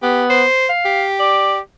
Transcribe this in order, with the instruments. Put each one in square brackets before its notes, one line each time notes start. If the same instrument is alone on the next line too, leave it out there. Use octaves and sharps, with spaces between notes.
[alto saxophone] B3 [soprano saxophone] G4
[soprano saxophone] C5
[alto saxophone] F5
[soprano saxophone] G4
[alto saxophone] D5